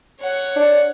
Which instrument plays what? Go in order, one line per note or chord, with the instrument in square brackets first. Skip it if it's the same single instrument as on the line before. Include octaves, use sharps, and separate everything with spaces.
[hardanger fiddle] C#5 F#5
[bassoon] D4